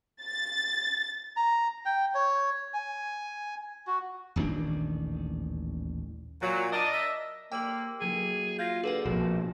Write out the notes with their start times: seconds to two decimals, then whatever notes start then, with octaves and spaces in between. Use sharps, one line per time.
0.22 A6
1.36 A#5
1.86 G5
2.14 C#5
2.74 G#5
3.87 F#4
4.36 D#1 A1 D#3 D4
6.42 A#2 F#3
6.72 D4 A#4 D5 D#5
6.93 E5
7.52 A#3 G4 C5 D5 G5 E6 F#7
8.01 F#3 A#3 E4 G#4
8.59 F4 G6 A#6 D#7
8.84 D3 G#4 B4 F#5
9.06 A#1 B2 C4 F#4